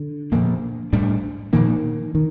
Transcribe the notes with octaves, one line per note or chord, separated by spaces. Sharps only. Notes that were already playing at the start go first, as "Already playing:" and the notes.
Already playing: D3
A#2 F3 A#3 D4
A2 G3 D4
A#2 D#3 F3 A#3
D#3